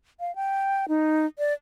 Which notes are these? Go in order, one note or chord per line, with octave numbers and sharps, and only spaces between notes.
F5
G5
D#4
D5